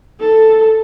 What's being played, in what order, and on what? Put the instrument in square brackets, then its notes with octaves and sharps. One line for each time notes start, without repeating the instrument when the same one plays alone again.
[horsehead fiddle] A4